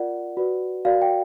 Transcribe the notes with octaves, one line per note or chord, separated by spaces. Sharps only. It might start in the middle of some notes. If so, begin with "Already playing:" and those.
Already playing: F4 A#4 D5 F#5
F#4 B4 D5
F#4 A#4 D5 F5
G5